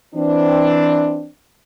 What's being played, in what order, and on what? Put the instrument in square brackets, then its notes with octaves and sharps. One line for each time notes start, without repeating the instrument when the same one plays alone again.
[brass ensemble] E3 C4 D4